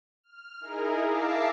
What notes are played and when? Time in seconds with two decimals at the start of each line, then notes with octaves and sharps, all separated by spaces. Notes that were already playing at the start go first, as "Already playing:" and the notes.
0.24 F6
0.60 D#4 E4 G#4 A#4
1.05 E5 F5 A5 D6 A#6 C7